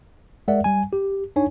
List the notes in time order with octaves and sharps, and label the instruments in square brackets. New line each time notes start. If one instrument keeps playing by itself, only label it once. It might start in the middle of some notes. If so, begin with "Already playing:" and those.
[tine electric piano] G#3 A#4 D5 E5 F#5
G3 G#5
G4
D4 D#4 C#5 G#5